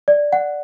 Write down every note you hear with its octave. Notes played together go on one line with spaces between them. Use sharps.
D5
F#5